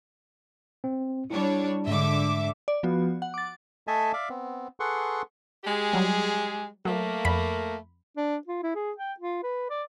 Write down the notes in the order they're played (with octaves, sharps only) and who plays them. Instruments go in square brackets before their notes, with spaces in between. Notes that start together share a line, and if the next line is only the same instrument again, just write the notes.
[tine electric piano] C4
[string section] G3 D4 C#5 [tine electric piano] E4
[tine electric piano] G#2 G#3 [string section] D3 E5 D6
[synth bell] D5
F3 B3 F#4
F#5
D6 A6
[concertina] A3 A4 D#5 E5 G#5 A5
D5 E5 F5 D6
B3 C4
G#4 A4 B4 F#5 C6 C#6
[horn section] G#3 G4 G#4
[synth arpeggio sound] F#3 G3
[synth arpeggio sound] F#3 [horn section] A3 A#3
[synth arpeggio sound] F2 B5
[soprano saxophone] D4
F4
E4
G#4
G5
F4
B4
D5